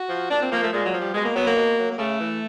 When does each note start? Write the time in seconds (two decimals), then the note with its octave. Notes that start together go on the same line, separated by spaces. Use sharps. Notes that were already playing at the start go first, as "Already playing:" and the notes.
Already playing: F#4
0.09 F3
0.30 A#2 D4
0.41 C4
0.51 F3 A#3
0.62 A3
0.72 A#2 G#3
0.86 F#3
0.93 F3
1.00 G3
1.14 B2 G#3
1.25 A#3
1.34 F#3 B3
1.46 A#3
1.56 B2
1.77 F#3
1.91 A#3
1.98 C#3 A3
2.19 E3